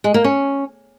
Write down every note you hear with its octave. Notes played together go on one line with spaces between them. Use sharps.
G#3
A#3
C#4